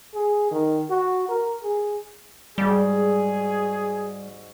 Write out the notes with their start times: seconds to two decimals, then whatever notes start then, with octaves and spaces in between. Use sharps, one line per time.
0.14 G#4
0.52 D#3
0.90 F#4
1.29 A#4
1.63 G#4
2.58 G#2 G3 F#4 G#4